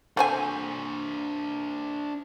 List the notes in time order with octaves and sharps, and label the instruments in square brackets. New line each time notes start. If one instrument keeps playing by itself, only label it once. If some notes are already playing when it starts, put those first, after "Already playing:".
[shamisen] A3 C4 G#5 [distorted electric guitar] D4 C5